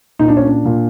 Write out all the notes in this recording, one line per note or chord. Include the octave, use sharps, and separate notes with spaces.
A#2 D#4
D4
C#4
D4
A#2